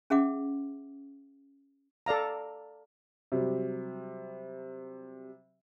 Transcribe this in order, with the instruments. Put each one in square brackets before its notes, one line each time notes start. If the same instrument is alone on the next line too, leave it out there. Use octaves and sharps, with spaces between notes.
[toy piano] C#4 G#4 E5 F#5 D6
[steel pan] A4 D5 F5 A#5
[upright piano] C3 F#3 G3